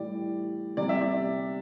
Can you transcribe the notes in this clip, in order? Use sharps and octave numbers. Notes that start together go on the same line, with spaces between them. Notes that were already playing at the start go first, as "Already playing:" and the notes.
Already playing: A2 E3 G3 D5
C3 G3 D5
E5
D5